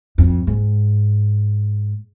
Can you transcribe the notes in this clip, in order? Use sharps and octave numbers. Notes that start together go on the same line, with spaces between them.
F2
G#2